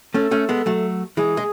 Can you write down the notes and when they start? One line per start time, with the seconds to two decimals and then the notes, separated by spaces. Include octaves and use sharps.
0.14 A3 C#4 A4
0.31 A3 C#4
0.49 G#3 B3
0.66 F#3 A3
1.17 E3 G#3 G#4
1.37 G#3